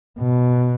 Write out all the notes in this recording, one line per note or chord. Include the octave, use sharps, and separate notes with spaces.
B2